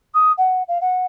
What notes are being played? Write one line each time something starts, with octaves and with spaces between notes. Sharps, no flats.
D#6
F#5
F5
F#5